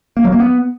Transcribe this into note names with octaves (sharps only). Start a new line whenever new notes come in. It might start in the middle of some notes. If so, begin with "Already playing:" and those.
A#3
F#3
A#3
B3